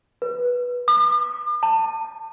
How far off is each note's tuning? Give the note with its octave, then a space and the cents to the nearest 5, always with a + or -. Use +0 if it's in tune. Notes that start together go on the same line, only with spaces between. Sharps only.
B4 -10
D6 +45
A5 +25